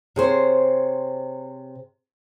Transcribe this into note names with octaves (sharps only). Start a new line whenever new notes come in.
C3 G#4 C5 C#5